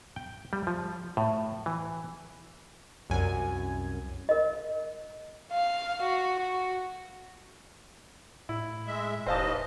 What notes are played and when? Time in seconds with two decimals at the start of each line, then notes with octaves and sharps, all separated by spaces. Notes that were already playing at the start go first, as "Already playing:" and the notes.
0.16 G5
0.53 G3
0.67 F3
1.17 A2
1.66 E3
3.10 C2 F#2 G#5
4.29 A#4 D#5
5.52 F5
6.02 F#4
6.39 F#4
8.49 A2 E4
8.86 G#3 E5
9.27 E1 D#2 E3 C5 D#5 F5 A5